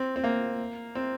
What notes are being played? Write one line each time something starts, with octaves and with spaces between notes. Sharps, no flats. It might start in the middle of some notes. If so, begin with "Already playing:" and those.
Already playing: C4
C4
A#3
C4